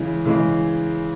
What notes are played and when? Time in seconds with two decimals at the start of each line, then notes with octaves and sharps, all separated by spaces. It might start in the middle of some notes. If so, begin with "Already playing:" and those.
Already playing: C#3 E3 G#3
0.25 C#3 E3 G#3